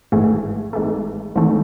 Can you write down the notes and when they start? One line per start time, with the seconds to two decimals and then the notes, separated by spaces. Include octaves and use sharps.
0.12 G#1 G#2 E3 A3
0.73 G#1 G#2 E3 A3
1.35 G#1 G#2 E3 A3